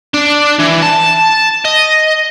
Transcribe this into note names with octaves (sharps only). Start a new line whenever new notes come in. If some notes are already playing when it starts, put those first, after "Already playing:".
D4
E3
A5
D#5